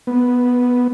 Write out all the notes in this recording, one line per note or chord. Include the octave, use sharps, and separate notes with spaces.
B3